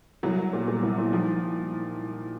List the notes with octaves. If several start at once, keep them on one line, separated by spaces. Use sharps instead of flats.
C2 F#3
C2
A#2
A#2
C2
A#2
D#3 F3